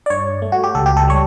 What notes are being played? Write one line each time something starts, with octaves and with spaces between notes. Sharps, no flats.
D5
G2 C#5
A3
F#4
G4
C#2 A4
G4
A4
G3 C#5